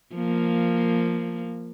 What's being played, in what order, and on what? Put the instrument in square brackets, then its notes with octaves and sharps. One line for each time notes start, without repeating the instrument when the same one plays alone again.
[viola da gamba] F3 A#3